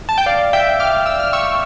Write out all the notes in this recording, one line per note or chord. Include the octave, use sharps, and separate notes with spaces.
A5
G5
D5 F5
E5 G5
D6 F6
E6
F6
C#6 E6